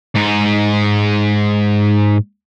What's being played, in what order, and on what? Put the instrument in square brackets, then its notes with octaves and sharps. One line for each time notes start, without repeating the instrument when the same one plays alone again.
[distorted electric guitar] G#2 D#4